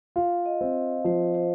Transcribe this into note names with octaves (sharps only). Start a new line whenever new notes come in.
F4 F5
D#5
C4
F3 C5
C5